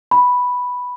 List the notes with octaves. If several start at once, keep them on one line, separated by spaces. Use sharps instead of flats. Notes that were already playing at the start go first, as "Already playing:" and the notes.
B5